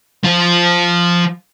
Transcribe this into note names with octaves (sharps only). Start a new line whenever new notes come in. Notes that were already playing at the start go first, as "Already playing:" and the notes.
F3 F4